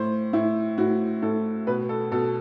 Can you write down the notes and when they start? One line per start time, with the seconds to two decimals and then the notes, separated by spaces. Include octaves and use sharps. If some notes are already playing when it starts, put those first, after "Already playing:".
Already playing: A2 C5
0.33 A2 E4
0.78 A2 F#4
1.22 A2 A4
1.67 B2 B4
1.89 A4
2.12 B2 A4